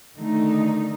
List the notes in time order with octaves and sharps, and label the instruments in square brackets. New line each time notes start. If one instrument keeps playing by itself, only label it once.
[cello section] D3 D#3 A3 D#4